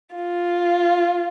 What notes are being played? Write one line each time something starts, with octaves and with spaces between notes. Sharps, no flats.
F4